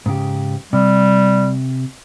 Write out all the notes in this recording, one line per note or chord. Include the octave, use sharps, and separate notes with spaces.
G#2 C#3 G4
C3 G3